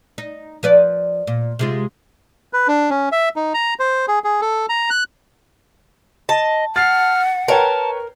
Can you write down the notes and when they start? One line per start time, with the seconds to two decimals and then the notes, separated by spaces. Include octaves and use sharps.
0.18 D#4
0.63 F3 B4 D5
1.27 A#2
1.59 C3 G#3 F4
2.53 B4
2.68 D4
2.90 C#4
3.12 E5
3.36 D#4
3.54 A#5
3.79 C5
4.08 G#4
4.24 G#4
4.41 A4
4.69 A#5
4.90 F#6
6.29 D#5 A5
6.76 F#5 F6 A6 C7
7.48 A#4 B4 C#5 G5 A5